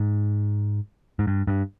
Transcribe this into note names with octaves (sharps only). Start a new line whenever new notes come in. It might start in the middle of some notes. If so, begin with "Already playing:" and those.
Already playing: G#2
G#2
G2
G2